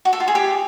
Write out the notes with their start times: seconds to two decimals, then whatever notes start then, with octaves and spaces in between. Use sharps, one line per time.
0.05 F#4
0.13 A4
0.20 F4
0.28 G#4
0.35 G4